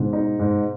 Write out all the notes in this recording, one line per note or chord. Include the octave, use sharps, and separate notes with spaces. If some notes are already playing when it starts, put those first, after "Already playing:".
Already playing: G#2 B2
D#4
G#2